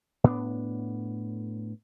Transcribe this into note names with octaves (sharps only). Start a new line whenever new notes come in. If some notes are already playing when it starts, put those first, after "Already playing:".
A2 B3 D4